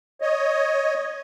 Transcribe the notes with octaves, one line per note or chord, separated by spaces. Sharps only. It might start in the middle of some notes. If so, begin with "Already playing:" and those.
C#5 D#5